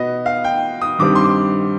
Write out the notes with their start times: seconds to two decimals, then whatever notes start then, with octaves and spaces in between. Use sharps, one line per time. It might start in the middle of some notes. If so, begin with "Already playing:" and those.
Already playing: B2 B3 D#5
0.26 F5
0.44 G5
0.81 D#6
0.99 G2 D#3 G3 C4 D6
1.15 C6
1.24 D6